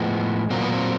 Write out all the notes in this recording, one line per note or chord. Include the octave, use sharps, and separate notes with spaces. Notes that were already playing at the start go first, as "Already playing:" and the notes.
Already playing: A2 F3 G#3 B3
A#2 F#3 A#3 C4
B3
C4